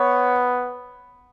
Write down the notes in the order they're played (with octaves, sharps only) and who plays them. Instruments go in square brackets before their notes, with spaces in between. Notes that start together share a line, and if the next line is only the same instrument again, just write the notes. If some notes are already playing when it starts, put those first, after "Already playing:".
Already playing: [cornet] B3 [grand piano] C#5